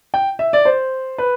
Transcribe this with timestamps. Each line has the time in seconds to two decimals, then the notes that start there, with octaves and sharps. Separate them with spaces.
0.14 G5
0.39 E5
0.53 D5
0.65 C5
1.18 B4